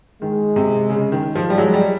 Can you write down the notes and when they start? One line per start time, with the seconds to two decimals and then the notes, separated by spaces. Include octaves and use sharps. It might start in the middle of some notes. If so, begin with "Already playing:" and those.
0.22 D#3 G#3
0.56 C3
0.90 C#3
1.12 D#3
1.35 F3
1.50 G3
1.58 F#3 G#3
1.74 G3